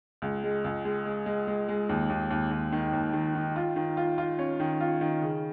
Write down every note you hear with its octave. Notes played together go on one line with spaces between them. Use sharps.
C#2
G#3
C#2
G#3
G#3
G#3
G#3
G#3
D#2
D#2
D#2
D#2
D#3
D#2
D#3
D#3
F4
D#3
F4
F4
C#4
D#3
F4
D#3
C#3